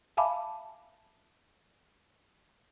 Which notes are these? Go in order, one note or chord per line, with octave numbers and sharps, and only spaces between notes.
E5 F5 G#5 A5 B5 D6